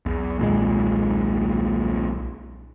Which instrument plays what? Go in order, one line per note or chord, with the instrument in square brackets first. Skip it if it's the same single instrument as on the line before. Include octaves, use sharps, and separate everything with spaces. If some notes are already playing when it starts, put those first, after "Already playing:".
[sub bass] B1 [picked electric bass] E2
[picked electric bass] D#2 A#2 G#3